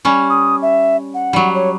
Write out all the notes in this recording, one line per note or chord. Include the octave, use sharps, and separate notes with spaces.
G3 C#4
D#6
E5
F#5
F#3 G3
C#5